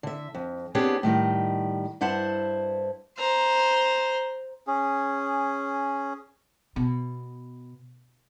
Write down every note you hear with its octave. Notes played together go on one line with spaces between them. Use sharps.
D3 E5
F2
B3 C4 D4 G4 G#4 C#5
A2 D#3 G3 D#5
G2 E4 C5 F#5 A5
C5 A#5
C#4 G#4
B2